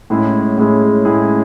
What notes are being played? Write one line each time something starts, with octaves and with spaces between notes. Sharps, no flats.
A2 G#3 C#4 E4 G#4
A2 G#3 C#4 E4 G#4
A2 G#3 C#4 E4 G#4